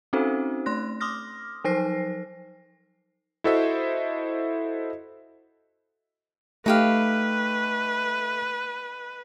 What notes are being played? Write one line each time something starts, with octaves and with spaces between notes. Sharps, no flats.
C4 C#4 D#4 F#4 A4 C5
A3 C6 F#6 A#6
C6 D6 D#6 F6 A#6
F3 F#3 D#4 C5 A#6 C7
E4 F#4 A4 C5 D#5 E5
A3 D#4 G4 B4 F5